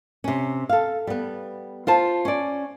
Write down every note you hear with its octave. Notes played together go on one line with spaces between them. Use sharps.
C3 C#4
A4 F5
G3 B3
F4 C5 A5
C#4 D5